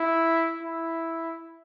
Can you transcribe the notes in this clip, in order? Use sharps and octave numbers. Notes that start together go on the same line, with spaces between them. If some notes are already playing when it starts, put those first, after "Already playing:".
Already playing: E4
E4